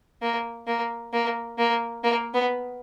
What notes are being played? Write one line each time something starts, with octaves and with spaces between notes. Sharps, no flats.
A#3
A#3
A#3
A#3
A#3
B3